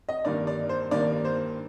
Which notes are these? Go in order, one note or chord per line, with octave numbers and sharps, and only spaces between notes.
D#5
G2 D#3 A#3 D5
D5
C5
G2 D#3 A#3 D5
C5